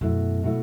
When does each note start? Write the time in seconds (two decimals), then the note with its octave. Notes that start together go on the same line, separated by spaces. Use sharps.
0.01 F#2 B2 A3 E4
0.43 B2 A3 E4